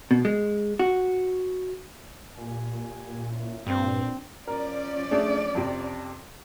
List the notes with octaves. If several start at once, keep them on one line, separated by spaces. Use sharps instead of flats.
B2
G#3
F#4
A#2 G4 G#5
C#4 E4
G2 C4 D4
F3 C#4 A#4 D5
A3 D4 G#4
F2 C3